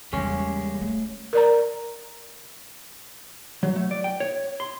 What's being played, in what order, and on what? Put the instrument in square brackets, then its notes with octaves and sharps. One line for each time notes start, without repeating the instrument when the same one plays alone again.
[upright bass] E2 C#3 [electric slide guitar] G3 G#3 A#3 [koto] C#4
[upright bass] A3
[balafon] A#4 D5 A#5
[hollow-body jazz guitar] F#3
A3
D5
G5
C#5
C6